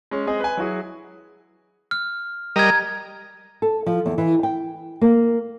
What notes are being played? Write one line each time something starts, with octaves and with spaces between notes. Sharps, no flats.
G#3 C#4
G#3 C4 G#4 D#5
B4 G#5
F#3 E4 F#4 G#4
F6
G3 A#4 D#5 A#5 G#6
A4
F3
E2
E3
G5
A#3